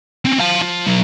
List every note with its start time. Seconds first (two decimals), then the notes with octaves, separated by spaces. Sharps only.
0.25 C4 C#4
0.40 F5 A5
0.62 F3
0.87 F#3 B3